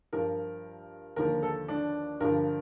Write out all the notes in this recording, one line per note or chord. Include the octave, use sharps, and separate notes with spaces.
G2 F3 A#4
D#2 D3 F3 A#4
A4
D4
G2 D3 F3 A#4